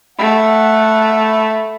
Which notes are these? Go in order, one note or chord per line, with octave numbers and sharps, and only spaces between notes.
A3 F#5 B5